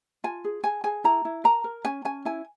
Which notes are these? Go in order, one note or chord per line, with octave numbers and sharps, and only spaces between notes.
F4 G#5
G#4
G#4 G#5
G#4 G#5
E4 A#5
E4
A#4 A#5
A#4
C#4 G#5
C#4 G#5
E4 G#5